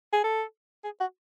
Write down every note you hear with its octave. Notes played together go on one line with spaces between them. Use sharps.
G#4
A4
G#4
F#4